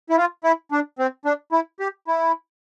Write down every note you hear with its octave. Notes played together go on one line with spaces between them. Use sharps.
E4
F4
E4
D4
C4
D4
E4
G4
E4